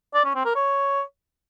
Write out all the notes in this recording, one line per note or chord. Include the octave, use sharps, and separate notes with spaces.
D5
C#4
C4
A#4
C#5